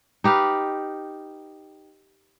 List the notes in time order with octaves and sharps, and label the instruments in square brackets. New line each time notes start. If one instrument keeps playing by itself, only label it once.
[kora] D#4 G4 B4 F5